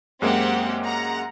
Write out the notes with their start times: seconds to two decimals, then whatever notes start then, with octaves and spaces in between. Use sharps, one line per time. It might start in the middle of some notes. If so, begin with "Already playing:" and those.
0.22 F#2 G#3 A#3 C4 G4 F#5
0.85 F#5 A#5